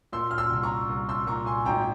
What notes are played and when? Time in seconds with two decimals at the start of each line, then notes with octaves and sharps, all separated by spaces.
0.13 A#2 C6 E6
0.31 F6
0.38 C6 E6
0.50 C2
0.63 A#5 C#6
0.89 C2
1.09 C6 E6
1.27 A#2 A#5 C#6
1.46 G#5 C6
1.65 G#1 G5 A#5